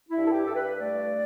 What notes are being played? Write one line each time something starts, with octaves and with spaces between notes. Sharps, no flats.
E4
G2
A4
G4
G2 A4
B4
A3 D5